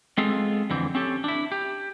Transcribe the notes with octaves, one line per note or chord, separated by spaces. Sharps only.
G#3 B3 C4 F4 G#4 A4
F2 D3 E3 C4
C4 C#4 G4 A4
D4 E4
G4